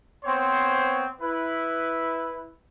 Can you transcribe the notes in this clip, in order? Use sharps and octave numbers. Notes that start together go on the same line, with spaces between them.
B3 C4 C5 C#5 C6
E4 B4